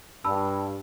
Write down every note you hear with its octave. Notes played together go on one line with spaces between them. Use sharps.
G2 A5 B5 E6